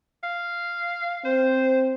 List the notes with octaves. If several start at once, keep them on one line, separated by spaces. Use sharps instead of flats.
F5
C4 C5